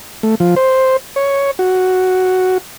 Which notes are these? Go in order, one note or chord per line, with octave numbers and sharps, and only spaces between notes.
A3
F3
C5
C#5
F#4